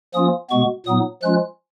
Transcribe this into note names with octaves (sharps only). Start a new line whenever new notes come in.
F3 A#3 C#4 F4 D#6
B2 G#3 B3 C#6
A#2 F#3 B3 D#4 D#6
F3 G#3 C#4 F4 F#6